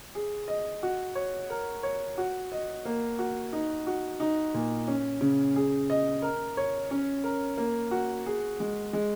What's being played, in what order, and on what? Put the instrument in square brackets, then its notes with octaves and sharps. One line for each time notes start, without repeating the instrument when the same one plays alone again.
[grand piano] G#4
D#5
F#4
C#5
A#4
C#5
F#4
D#5
A#3
F#4
D#4
F#4
D#4
A#2
C#4
C#3
G#4
D#5
A#4
C#5
C#4
A#4
A#3
F#4
G#4
G#3
G#3